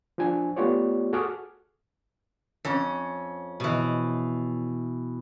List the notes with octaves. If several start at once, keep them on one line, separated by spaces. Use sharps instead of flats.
F3 D4 G#5
A3 B3 F4 G4 C#5 D5
F#4 G#4 A4 D6 D#6 F6
F2 C#4
B2 E3